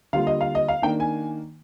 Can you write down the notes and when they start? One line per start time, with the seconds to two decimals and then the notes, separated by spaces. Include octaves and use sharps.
0.13 D3 G3 A#3 F4 F5
0.27 D#5
0.41 F5
0.55 D#5
0.68 F5
0.82 D#3 A#3 D4 G5
1.00 G#5